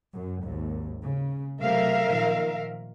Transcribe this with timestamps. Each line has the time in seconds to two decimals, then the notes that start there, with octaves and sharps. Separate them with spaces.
0.13 F#2
0.43 G#1 D#2
1.03 C#3
1.62 C3 F#3 A3 A#4 E5 F5
2.06 A#2 D#3 F3